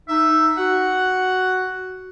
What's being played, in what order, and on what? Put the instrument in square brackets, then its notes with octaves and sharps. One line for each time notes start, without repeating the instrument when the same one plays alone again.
[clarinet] D#4 [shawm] E5
[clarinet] F#4 [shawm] F#5